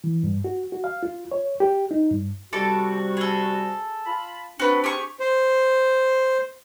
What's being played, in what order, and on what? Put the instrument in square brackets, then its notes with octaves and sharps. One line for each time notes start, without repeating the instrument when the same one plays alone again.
[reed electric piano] E3
G2
F#4
F#4
F5
F4
C#5
G4
D#4
G2
[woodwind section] C3 G3 F#4 [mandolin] A4 D5 A5
[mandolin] G#4 A4
[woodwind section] F4 A5 B5
[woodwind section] C4 D4 [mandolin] F#4 B4
[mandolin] G4 G#4 C#6
[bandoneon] C5